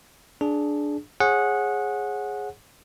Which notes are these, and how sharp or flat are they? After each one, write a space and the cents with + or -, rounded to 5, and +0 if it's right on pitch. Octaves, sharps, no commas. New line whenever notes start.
D4 +0 G#4 +20
G#4 +0 C#5 -35 F#5 -15